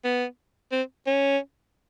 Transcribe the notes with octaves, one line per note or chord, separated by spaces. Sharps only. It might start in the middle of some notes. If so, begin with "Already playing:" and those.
B3
C4
C#4